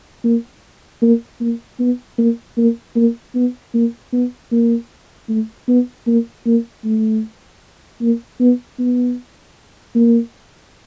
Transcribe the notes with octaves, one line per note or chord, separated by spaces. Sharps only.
A#3
A#3
A#3
B3
A#3
A#3
A#3
B3
A#3
B3
A#3
A3
B3
A#3
A#3
A3
A#3
B3
B3
A#3